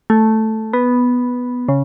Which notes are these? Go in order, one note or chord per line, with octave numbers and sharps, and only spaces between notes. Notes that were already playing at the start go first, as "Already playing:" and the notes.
A3
B3
C#3